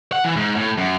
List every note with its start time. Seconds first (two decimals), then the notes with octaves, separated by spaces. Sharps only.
0.12 F#5
0.24 E3
0.37 G#2
0.56 A2
0.78 F#2